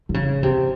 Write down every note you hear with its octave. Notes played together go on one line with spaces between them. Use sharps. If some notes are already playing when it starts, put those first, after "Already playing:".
D3
C#3
C3